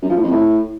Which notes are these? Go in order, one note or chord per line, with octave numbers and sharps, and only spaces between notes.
F#2
F3
A2
F2
A2